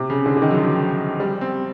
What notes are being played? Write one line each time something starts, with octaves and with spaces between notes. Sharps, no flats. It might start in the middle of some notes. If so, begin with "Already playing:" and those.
Already playing: C3
C#3
D3
D3
D#3
F#3
F3
G3
C4